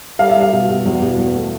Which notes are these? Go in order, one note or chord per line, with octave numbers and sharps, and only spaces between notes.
G3 F5
E5
G3
F5
B2
B2
E2
B2
E2
A3